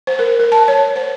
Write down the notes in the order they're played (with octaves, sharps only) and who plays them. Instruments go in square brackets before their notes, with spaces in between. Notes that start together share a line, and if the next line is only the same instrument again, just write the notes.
[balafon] C5
A#4
A#4
A5
C#5
C5